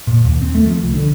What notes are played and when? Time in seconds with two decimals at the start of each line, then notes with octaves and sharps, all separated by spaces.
0.07 A#2
0.25 D#2
0.42 C4
0.55 A3
0.67 F3
0.83 C2
0.94 D3